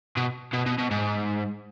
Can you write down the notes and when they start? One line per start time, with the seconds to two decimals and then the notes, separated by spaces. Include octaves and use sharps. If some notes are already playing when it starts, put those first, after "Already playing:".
0.17 B2
0.53 B2
0.66 B2
0.78 B2
0.91 G#2